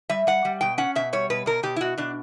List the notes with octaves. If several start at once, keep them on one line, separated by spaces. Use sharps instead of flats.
G3 E5
G3 F#5
G3
B2 G5
C#4 F#5
B2 E5
G3 C#5
B2 B4
B2 A#4
B2 G4
E4
B2 F#4
B2 D4